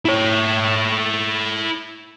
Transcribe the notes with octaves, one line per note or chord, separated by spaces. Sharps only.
E4 C#5